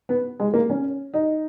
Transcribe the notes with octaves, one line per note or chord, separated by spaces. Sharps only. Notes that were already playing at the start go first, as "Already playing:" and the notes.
B3
G#3
A#3
C#4
D#4